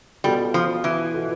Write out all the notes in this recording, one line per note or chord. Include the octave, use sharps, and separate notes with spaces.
B2 G3 B3 F4 A4
F3
E3
B2 B3 F4 A4